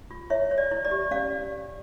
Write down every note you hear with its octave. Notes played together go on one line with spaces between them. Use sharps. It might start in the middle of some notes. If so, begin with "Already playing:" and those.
F4
E4 C#5 E5
C#5
D5
E4
D5
G4
C#4 D5 F5